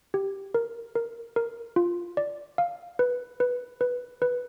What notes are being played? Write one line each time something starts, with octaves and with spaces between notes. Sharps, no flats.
G4
A#4
A#4
A#4
F4
D5
F5
B4
B4
B4
B4